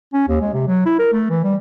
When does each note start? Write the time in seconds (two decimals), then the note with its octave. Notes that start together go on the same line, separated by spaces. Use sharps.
0.13 C#4
0.28 D#2
0.42 G#3
0.53 C3
0.67 F#3
0.86 E4
0.99 A#4
1.13 A3
1.30 E3
1.44 G3